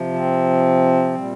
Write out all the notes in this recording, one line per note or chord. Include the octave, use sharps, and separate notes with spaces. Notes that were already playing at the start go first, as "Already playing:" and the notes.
Already playing: C3 F3
C4
A#2 G3